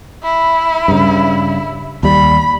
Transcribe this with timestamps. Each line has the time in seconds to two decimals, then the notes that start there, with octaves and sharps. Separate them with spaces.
0.23 E4
0.88 G2 C#3
2.03 D#2 G3 B5